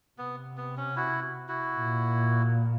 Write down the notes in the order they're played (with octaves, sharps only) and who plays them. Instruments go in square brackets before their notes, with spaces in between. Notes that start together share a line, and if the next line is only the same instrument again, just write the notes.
[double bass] C3 [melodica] B3
[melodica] B3
C#4
E4 F#4
E4 F#4
[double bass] A#2